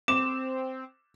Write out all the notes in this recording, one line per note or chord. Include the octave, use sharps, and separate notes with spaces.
C4 D6 E7